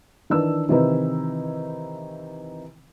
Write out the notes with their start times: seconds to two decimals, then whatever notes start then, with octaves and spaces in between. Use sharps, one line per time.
0.30 D#3 E3 D4 E6
0.68 C3 D#3 E3 C4 D#4 E4